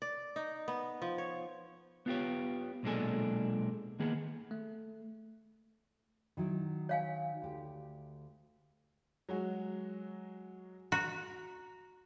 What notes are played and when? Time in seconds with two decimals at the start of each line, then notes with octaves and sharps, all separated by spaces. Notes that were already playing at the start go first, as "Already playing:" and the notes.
0.02 D5
0.36 D#4
0.68 B3
1.02 F3
1.18 C#5
2.06 B3 F4 G4 C#5
2.83 B1 A#2 G#3 D4 A4 G#5
3.99 D#3 A#3 B3 G#4
4.51 A3
6.37 D#3 F#3 E4
6.89 C#5 F5 G#5
7.42 D2 G4
9.29 F#3 G#3 F#4
10.92 F#4 A#5